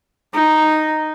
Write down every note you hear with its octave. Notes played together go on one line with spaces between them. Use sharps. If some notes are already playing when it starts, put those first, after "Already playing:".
D#4